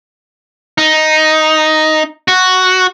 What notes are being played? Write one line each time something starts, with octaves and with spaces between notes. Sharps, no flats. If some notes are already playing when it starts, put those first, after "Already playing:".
D#4
F#4